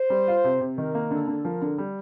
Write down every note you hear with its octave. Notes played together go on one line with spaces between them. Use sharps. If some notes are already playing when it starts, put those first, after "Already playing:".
Already playing: C5
G3
F4
C3
C3
D#3 A#4
A#3
D3 A4
D3
F3 A#4
D3
G3